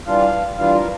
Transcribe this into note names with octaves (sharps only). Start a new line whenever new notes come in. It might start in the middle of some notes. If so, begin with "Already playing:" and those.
E3 G3 D4 F4 F5
E3 G3 D4 F4 F5
A#4